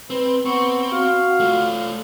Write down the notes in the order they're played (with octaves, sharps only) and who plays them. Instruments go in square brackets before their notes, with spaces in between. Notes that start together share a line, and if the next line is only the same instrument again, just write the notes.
[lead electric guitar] C4 [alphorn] B4
[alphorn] B3 [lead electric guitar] C4 [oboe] C#6
[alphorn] F#4 [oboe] F5
[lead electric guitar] A3 F4